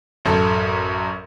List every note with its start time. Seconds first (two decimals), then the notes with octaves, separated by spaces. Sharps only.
0.25 A1 F#2 A4